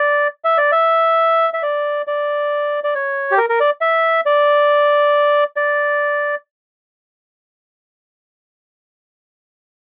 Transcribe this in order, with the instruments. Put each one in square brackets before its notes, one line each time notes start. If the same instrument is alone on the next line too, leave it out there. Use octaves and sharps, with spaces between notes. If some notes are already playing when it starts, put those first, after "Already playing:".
Already playing: [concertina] D5
E5
D5
E5
E5
D5
D5
D5
C#5
G4
A#4
A#4
D5
E5
D5
D5